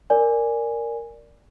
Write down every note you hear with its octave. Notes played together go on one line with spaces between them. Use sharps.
A#4 D5 G#5